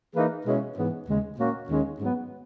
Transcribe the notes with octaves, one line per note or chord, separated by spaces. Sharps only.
E3 A#3 D#4 G#4 B4
B2 G#3 C#4 E4
G#2 E3 B3
D#2 C#3 G#3
A#2 A#3 C#4 F#4
D#2 D#3 G#3 C#4
G#2 F#3 B3